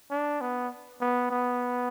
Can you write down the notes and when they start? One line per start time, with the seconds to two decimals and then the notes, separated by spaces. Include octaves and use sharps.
0.11 D4
0.41 B3
1.01 B3
1.31 B3